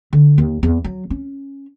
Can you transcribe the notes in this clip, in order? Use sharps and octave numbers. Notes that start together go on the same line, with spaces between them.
D3
D#2
E2
F#3
C#4